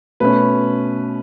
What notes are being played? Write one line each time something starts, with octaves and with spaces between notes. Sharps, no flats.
B2 A3 C#4 B4